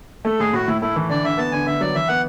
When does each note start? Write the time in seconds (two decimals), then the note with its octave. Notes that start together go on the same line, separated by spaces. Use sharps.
0.25 A3 A4
0.39 A2 G#4
0.53 A2 F#4
0.67 A2 E4
0.81 A3 E4
0.96 E3
1.09 D3 D5
1.24 D3 E5
1.38 B3 A5
1.52 D3 G#5
1.66 D3 E5
1.81 F#3 D5
1.95 E3 E5
2.08 B3 F#5